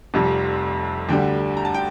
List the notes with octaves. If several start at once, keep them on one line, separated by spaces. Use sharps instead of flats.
F1 F2 C3 G3
D2 D3 G3 G5
A#5
A5
G5